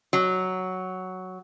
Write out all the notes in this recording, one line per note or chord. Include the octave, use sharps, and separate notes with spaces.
F#3